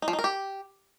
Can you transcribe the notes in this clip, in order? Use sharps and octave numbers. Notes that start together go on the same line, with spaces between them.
D#4
F3
D#4
A#4
G4